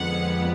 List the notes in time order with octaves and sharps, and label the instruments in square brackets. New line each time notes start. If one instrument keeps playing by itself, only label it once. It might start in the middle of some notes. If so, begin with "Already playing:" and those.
Already playing: [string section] F2 D3 G#3 B3 F#5